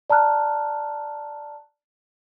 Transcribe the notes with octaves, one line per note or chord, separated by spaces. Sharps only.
D5 A5 A#5 F6 F#6